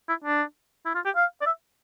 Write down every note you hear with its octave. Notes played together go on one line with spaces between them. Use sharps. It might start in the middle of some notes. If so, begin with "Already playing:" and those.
E4
D4
E4
F4
G4
F5
D5
E5